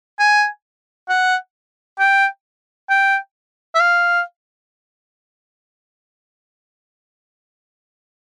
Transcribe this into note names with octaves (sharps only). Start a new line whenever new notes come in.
G#5
F#5
G5
G5
E5
F5